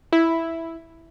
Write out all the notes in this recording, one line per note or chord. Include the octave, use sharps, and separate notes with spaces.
E4